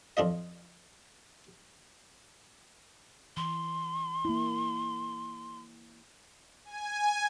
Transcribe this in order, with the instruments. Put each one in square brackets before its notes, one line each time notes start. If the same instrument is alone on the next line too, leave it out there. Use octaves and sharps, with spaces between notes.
[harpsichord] F2 D4 F4 D#5
[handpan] E3 [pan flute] C6
[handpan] A#3 E4
[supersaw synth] G#5